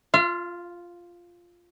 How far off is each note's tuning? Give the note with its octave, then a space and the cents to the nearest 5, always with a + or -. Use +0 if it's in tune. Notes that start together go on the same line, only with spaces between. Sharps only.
F4 +0 F5 -40